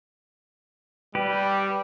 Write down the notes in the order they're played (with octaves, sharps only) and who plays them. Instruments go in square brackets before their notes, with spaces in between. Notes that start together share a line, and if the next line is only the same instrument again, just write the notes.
[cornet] G3 [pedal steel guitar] G4 B4